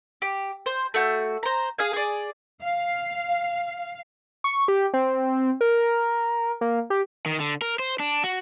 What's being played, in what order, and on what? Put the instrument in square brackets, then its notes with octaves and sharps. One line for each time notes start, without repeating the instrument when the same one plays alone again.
[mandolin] G4
C5
A3 F#4 G6
C5 A#5
G#4 F5 G#5
G#4 D5
[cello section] F5
[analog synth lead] C#6
G4
C4
A#4
A#3
G4
[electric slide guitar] D#3
D3
A#4
C5
D4
F#4